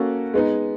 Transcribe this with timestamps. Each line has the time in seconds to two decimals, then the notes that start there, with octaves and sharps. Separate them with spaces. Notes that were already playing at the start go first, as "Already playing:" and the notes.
Already playing: A#3 C#4 F#4 A4
0.34 G#3 B3 D#4